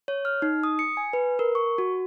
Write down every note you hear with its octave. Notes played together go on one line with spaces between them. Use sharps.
C#5
F6
D#4
D#6
C#7
G#5
B4
A#4
C#6
F#4